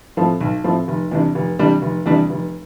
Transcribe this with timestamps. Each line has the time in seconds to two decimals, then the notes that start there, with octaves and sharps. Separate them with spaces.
0.17 A2 F3 A3 C4
0.41 B1
0.64 A2 F3 A3 C4
0.88 F1
1.11 E2 C3 G3 D4
1.35 F1
1.59 E2 C3 G3 D4
1.82 F1
2.06 E2 C3 G3 D4
2.30 F1